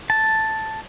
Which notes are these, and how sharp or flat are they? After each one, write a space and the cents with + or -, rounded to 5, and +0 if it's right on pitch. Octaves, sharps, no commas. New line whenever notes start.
A5 +0